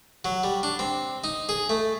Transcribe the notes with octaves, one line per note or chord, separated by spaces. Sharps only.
F#3
G3
D4
C4
D#4
G#4
A3